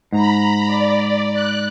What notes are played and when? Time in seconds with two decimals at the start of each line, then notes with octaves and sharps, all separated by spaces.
0.12 G#2 A#5 B5
0.67 D5
1.34 F#6